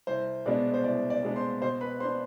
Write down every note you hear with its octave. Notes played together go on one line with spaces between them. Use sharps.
C2 C5
B2 G#3 B3 D4 D5
C5
C2 D5
D5
B2 G#3 B3 D4
C5 C6
B2 C5 C6
B4 B5
B3 D4 C5 C6